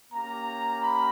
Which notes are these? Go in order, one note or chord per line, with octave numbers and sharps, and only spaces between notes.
A#3 C#4 G4 A#5
B5